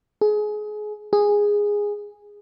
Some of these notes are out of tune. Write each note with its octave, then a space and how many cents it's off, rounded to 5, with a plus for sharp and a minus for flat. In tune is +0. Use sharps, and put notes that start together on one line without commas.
G#4 +25
G#4 -10